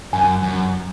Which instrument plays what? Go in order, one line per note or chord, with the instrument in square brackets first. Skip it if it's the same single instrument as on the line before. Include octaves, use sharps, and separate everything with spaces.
[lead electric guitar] F#2 [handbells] G#5
[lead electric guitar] F#2